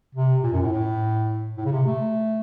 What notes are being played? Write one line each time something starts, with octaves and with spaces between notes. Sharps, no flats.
C3
A#2
F#2
A2
A2
A2
C#3
C3
A3